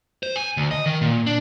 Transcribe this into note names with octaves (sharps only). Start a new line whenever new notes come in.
C5
G#5
D2
D#5
D#3
A#2
D4